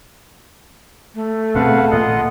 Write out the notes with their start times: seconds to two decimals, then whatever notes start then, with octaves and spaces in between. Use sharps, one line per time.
1.15 A3
1.55 D1 B2 C4 G#4 A4 B4 F5 F#5
1.91 D1 A1 A#2 F4 D#5 F#5